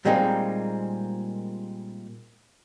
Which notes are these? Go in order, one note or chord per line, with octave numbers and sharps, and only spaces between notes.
A#2 G3 G#3 A#3 C4 D#4